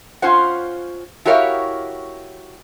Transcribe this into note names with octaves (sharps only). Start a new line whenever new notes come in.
C#4 F4 C5 F#5
E4 F#4 G4 A#4 C#5 F5